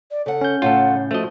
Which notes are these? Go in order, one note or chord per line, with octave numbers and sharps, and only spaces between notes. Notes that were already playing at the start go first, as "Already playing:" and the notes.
D5
C#3 A4 F#5
C#4 G6
A2 C#3 F4 A4 F#5
F3 A3 F#4 D#5